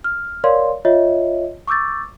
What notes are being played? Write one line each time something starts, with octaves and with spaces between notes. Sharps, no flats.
F6
A#4 C#5 D5 F5 C6
F4 C#5 D#5 E5
C#6 D6 E6 G6 A6